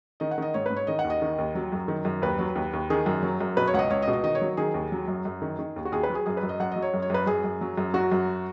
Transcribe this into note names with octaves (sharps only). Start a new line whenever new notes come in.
D#3 D#5
F#5
D#3 D#5
G#2 C#5
G#2 B4
C#5
D#3 D#5
F#5
D#2
D#5
D#3
D#2
F#3
F#2
D#3
F#2
D#2 B4
F#3
D#2
D#2
D#3 G#4
F#2
F#3
F#2
B2 B4
C#5
C#2 D#5 F#5
C#2 C#5
D#5
B2
D#5
D#3 D#5
C#5
F#3
D#3 G#4
D#2
F#3
F#2
F#2
D#3
D#3
D#2
F#4
D#2 G#4
B4
F#3
G#4
F#2 G#4
B4
F#2
D#5
F#2 F#5
F#3 D#5
C#5
F#2
C#5
F#2 B4
F#2 G#4
F#2
F#3
F#2
F#3 F#4
F#2